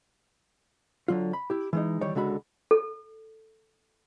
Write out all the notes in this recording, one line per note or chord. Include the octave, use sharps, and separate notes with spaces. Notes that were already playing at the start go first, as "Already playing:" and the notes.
D3 F#3 F4
B5
E4 G4
E3 G#3 D#4
D#3 E3 G3 C#5 D5
C#2 D3 G#3 F#4 B5
A4